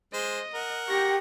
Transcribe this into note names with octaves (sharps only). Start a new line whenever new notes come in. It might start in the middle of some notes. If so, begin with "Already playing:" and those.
G#3 C5 D#5
A#4 F#5
G4 C#6 A#6